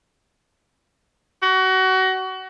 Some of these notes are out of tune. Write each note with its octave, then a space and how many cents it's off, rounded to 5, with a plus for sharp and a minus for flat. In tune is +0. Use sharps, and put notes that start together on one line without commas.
F#4 +25